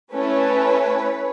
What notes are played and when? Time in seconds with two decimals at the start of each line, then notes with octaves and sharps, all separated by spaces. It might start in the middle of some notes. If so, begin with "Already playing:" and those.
0.14 A3 C#4 E4 B4 C#5